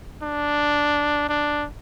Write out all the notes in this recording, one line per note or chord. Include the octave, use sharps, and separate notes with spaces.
D4
D4